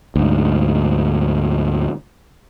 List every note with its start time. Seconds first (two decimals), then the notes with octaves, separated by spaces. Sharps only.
0.16 D2 G#2